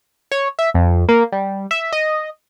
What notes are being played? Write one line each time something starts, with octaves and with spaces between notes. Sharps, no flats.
C#5
E5
F2
A#3
G3
E5
D#5